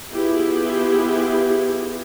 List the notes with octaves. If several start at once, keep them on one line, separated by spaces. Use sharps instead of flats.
B3 E4 F4 G4 G#4